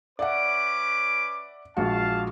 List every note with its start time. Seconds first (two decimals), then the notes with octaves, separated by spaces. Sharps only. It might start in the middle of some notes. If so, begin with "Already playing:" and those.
0.19 C#4 B4 D5 E5 F#5 D6
1.77 A#1 G#3 F#4 F5 A5